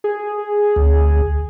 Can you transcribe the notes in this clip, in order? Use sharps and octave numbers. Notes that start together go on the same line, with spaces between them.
G#4
D2